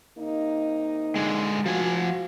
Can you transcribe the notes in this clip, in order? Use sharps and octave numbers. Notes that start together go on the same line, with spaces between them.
C3 A#3 D#4
D3 G#3
F3 F#4 G#5